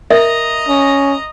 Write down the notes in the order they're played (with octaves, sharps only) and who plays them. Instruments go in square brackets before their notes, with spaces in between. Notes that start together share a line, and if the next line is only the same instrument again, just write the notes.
[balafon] A#4 [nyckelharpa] D#5 A#5 [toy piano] E5
[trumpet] C#4